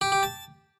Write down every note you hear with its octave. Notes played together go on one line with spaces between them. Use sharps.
G4
G4
A5